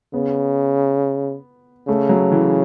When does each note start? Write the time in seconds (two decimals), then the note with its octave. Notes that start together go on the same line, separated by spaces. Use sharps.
0.14 C#3 B3
1.88 C#3 A3
2.09 F#3
2.32 E3